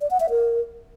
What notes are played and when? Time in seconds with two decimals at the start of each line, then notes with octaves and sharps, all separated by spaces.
0.01 D5
0.11 F#5
0.20 E5
0.30 A#4